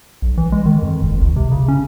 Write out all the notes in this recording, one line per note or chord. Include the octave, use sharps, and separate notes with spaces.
B1
E3
G#3
D#3
F2
F#1
C#2
C3
C#3
C#4